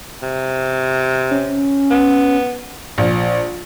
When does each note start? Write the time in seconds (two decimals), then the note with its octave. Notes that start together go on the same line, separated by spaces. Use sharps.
0.23 C3
1.31 C#4
1.91 B3
2.98 A#1